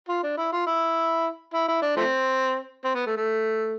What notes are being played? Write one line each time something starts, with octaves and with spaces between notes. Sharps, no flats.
F4
D4
E4
F4
E4
E4
E4
D4
F3 A3 C4
C4
B3
A3
A3